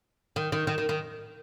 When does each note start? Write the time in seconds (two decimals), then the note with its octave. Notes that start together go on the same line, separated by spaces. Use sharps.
0.36 D#3
0.52 D#3
0.67 D#3
0.78 D#3
0.89 D#3